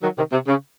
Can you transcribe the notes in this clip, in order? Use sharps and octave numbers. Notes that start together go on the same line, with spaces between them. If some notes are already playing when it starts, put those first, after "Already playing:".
D#3 F#3
C3 D#3
C3
C#3